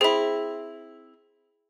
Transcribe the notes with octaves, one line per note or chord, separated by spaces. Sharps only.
C4 E4 G#4